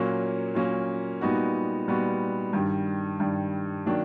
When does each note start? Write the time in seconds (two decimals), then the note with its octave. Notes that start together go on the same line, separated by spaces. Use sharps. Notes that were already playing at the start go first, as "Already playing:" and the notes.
Already playing: A#2 F#3 A#3 C#4
0.55 A#2 F#3 A#3 C#4
1.21 A#2 G3 B3 D#4 F#4
1.88 A#2 G3 B3 D#4 F#4
2.53 G2 D#3 G3
3.20 G2 D#3 G3
3.86 D#3 F#3 A#3 D4